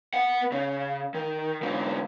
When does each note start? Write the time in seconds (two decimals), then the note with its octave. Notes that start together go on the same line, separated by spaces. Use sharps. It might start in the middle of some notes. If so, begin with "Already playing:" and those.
0.14 B3 F#5
0.52 C#3
1.14 D#3
1.63 G#2 D3